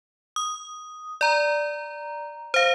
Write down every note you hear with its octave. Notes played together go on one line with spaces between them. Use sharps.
D#6
D5 A#5
C5 F5